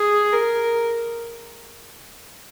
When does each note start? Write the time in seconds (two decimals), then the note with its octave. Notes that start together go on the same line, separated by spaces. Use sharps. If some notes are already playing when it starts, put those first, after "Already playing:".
Already playing: G#4
0.33 A#4